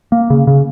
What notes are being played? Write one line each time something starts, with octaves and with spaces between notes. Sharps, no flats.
A#3
C#3
C#3